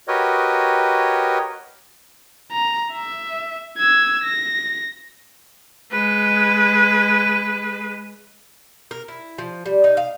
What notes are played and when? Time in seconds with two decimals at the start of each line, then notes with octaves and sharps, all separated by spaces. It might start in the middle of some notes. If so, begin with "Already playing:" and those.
0.08 F#4 G4 A#4 B4 C#5 D#5
2.52 A#5
2.93 E5
3.77 E6 G#6
4.24 A#6
5.91 G#3 B4
8.91 A#4
9.08 E4
9.38 F3
9.66 G3
9.84 D#4
9.97 F5